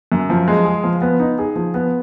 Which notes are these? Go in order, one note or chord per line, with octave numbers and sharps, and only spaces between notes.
F#2
F3
G#3
G#4
F3
B3
D#4
G#4
F3
B3